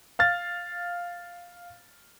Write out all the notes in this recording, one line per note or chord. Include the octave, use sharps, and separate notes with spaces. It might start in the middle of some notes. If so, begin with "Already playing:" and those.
F5 F6 A6